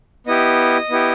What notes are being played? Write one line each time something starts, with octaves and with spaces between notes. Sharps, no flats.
B3 E4 G4 D#5
B3 E4 G4